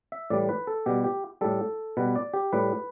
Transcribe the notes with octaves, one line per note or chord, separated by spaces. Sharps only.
E5
A2 E3 G3 D5
B4
A4
B2 G3 G4
G4
A2 G3 A4
B2 G3 B4
D5
G4
A2 G3 B4